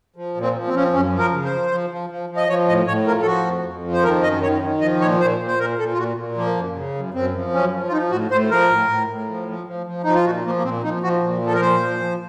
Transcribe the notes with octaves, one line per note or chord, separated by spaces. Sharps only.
F3
A#2
C4
F3
C4
F3 C#4
C4
F#2 C#4
F3
A#4
C#3
C5
F3
F3
F3
F3
F3
D#5
F3 C#5
A2 D#5
A2 C#5
F3 A#4
A4
F3 F#4
F2
F2
F3
C5
D#3 A#4
F#2 D#5
D#3 C#5
D#3
F3 D#5
A#2 C#5
A#2 C5
A#2
C5
A#2 A#4
A#2 A4
F4
A#2 F#4
A#2
F3 A#3
F#2
C#3
F#2
F#2 C4
F3
F#2 C#4
F3
F4
F3 D#4
A2 F#4
A2 C5
F3 A#4
A2
A2
A2
F3
F3
F3
F3
F3 D#4
F4
A#2 F#4
F3 A#3
A#3
A#2 C4
F3 D#4
F3 F#4
A#2
F3 A4
A#4
A#2 C5
F3
F3